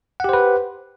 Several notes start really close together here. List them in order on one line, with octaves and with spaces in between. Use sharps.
F#5 G4 C5 B4